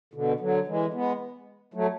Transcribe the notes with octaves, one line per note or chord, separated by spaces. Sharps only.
B2 D3
D3 F#3
E3 G#3
G#3 B3
F#3 A3